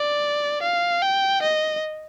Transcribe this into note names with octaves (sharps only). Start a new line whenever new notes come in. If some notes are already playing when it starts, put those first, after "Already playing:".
Already playing: D5
F5
G5
D#5